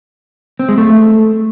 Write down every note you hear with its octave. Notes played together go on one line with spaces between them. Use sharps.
C4
G#3
A3